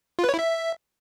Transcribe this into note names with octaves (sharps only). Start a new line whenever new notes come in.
F4
B4
C#5
E4
E5